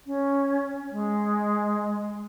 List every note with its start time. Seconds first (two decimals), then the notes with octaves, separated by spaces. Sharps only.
0.07 C#4
0.91 G#3